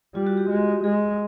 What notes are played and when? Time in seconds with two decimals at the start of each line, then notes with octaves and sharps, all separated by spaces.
0.15 G3 F4
0.27 F#4
0.37 G4
0.49 G#3
0.84 G#3 G#4